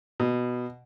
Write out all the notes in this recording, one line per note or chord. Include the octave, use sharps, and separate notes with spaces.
B2